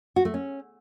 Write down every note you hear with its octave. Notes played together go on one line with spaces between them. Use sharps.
F#4
A3
C#4